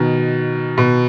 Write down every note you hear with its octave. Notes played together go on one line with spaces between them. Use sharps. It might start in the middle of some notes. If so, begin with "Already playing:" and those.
Already playing: B2 D#3
B2